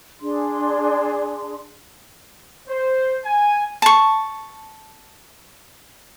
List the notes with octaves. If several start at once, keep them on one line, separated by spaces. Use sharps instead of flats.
D4 G#4 C6
C5
G#5
A5 C#6